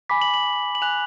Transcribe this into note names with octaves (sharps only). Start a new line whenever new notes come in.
G#5 B5 D6 B6
F#7
F#7
F#7
G#5 D6 F#6 F7